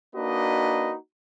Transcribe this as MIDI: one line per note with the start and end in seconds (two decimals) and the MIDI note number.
0.16 0.94 58
0.16 0.94 62
0.16 0.94 63
0.16 0.94 66
0.16 0.94 71
0.16 0.94 75